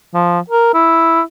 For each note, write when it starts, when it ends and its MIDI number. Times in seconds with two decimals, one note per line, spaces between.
0.14 0.39 53
0.50 0.70 70
0.74 1.21 64